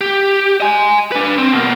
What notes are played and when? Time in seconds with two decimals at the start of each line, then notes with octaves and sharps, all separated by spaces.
0.01 G4
0.60 D#5 G#5
1.12 D4 B4
1.38 C4
1.53 B2 A#3